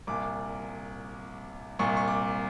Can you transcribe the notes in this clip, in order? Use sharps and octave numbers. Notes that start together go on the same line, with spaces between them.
C2 A#2 D6
C2 A#2 C#6
C#6
D6